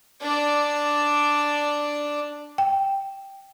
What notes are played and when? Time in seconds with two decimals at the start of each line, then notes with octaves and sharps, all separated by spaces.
0.22 D4 D5
2.58 G5